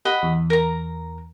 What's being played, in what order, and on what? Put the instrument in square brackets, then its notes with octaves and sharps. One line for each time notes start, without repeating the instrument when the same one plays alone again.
[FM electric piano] G4 [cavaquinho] D#5 F#5 B5
[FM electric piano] E2
[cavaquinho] A#4 A#5